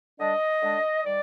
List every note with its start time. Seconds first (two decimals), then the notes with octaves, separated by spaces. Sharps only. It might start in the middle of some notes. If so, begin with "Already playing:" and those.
0.20 D3 G3 D4 D#5
0.63 D3 G#3 D4
1.05 D#3 G3 D5